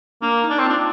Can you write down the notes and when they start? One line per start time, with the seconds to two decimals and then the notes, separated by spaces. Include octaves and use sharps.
0.22 A#3 D4
0.44 D#4
0.50 D4
0.59 C4
0.65 F4
0.69 D4